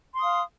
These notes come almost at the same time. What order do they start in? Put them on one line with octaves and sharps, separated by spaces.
C6 D#6 F5